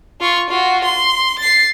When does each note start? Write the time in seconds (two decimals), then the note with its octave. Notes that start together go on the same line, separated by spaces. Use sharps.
0.20 F4 C#6
0.49 F4 F#4
0.84 C6
1.39 A6 C7